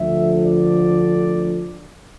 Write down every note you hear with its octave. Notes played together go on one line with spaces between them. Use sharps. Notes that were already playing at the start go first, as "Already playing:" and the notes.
Already playing: D2 D3 F3 E5
D5